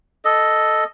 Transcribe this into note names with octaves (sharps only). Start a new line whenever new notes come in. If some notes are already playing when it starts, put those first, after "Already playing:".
A4 D#5